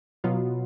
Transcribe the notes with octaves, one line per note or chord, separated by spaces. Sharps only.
B2 F#3 B3 F4